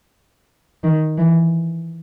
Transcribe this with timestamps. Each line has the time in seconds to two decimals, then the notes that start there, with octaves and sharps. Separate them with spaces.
0.83 D#3
1.17 E3